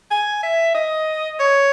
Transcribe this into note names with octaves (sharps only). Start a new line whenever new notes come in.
G#5
E5
D#5
C#5